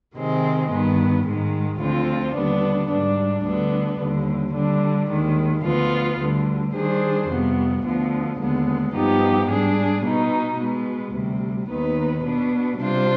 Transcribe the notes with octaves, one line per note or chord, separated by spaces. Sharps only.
C3 D#3 G#3 C4
G2 D#3 B3
G#2 D#3 G#3
D2 D3 F3 C4 F4
D#2 D3 G3 B3 D4
G#2 G3 D4
D2 D3 G3 B3 D4
D#2 D3 G3
D3 G3 D4
D#2 D#3 G#3
D2 D3 F3 B3 F4
D2 D3 G3
D#3 G3 D4 G#4 C5
F2 C3 G3 B3
D2 D3 F3 B3
D#2 D3 G#3 B3
G2 F3 B3 D#4 G4
G#2 G3 D4 G#4
B2 B3 D#4
B2 G#3 B3
D2 C3 G3
D#2 D#3 B3 D#4 B4
B2 B3 D4
C3 G3 D4 F4 C5